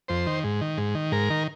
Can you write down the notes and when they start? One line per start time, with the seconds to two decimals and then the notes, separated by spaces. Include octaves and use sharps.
0.08 F2 C5
0.27 D#3
0.44 G#2
0.61 D#3
0.78 G#2
0.95 D#3
1.12 G#2 A#4
1.30 D#3